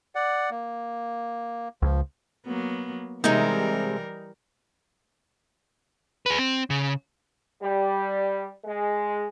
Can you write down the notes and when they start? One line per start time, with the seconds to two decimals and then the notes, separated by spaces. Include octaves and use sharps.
0.15 D5 F#5
0.51 A#3
1.82 C#2 F3
2.46 F#3 A#3 B3
3.24 C3 E3 G3 G#3 C4 D#4 A#4
6.26 G#4 B4
6.39 C4
6.70 C#3
7.61 G3
8.65 G#3